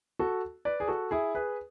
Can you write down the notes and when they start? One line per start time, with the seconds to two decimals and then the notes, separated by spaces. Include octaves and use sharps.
0.19 F#4 A4
0.65 B4 D5
0.80 G#4
0.88 F#4 A4
1.11 E4 G#4
1.35 G#4 B4